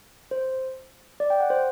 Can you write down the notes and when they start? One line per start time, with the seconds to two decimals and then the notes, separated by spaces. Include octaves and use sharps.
0.31 C5
1.20 D5
1.30 G5
1.40 F#5
1.50 C5